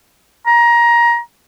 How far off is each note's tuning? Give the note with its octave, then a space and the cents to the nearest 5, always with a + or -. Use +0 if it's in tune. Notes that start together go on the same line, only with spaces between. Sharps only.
A#5 +20